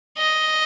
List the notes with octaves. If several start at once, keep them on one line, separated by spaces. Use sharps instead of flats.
D#5